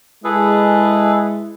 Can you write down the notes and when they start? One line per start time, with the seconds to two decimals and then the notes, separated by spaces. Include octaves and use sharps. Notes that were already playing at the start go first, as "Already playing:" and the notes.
0.24 G#3 E4 G#4 A4 B4